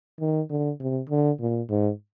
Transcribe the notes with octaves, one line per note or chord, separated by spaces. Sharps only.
D#3
D3
C3
D3
A#2
G#2